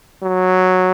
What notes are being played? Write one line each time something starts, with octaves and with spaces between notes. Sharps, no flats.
F#3